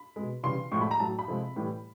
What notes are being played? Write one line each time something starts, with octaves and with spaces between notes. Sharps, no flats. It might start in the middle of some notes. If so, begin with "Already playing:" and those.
Already playing: B5
B2 G#3
C#3 E3 G3 C6
A2 F3 G#3 C#6
B5
A#5
A2 F#3 A5
B5
C3 F3 G#3
A2 E3 G3